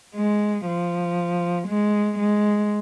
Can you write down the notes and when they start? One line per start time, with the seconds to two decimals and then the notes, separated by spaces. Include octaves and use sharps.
0.15 G#3
0.66 F3
1.68 G#3
2.19 G#3